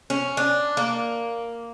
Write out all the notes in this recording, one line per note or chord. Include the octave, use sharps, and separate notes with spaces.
C#4
D4
A#3